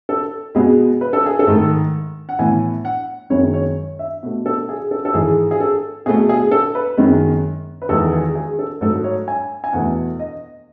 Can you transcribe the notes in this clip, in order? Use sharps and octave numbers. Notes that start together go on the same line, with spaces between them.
A4
B2 G#3 B3 G#4
B4
A4
G#4
A4
G#2 D#3 A3
F#5
A2 E3 B3 G#5
F#5
F#2 D#3 G#3 B3 C#5
C#5
E5
B2 A3
A4
G#4
A4
A4
G#2 E3 G#3 G#4
G#4
A4
B2 A3 G#4
G#4
A4
B4
F#2 D#3 G#3 B3
B4
E2 D#3 G#3 A4
G#4
G#4
A4
G#2 F#3 A3 A4
C#5
G#5
G#5
E2 B2 A3 F#5
D#5